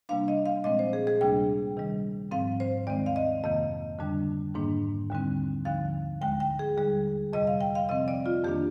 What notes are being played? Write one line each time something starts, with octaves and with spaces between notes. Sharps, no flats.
C3 G3 A#3 D4 F5
D#5
F5
A#2 F3 G#3 C4 D#5
C5
G#4
G#4
D2 C3 G3 A#3 D4 G5
C3 D#3 G3
G#2 F3 C4 F5
C5
D#2 D#3 G#3 C4 D5
F5
D#5
F2 C3 D#3 A#3 D#5
F2 D3 G3 D4
G#2 D#3 A#3 D4
D#2 D3 G3 C4
D#2 D3 F3 F5
D2 D3 G#3 G5
G5
G#4
D#2 D3 G3 G#4
F2 C3 G3 D#5
F5
G5
F5
C3 F3 C4 D#5
D5
F4
F2 D#3 A#3 D4 G4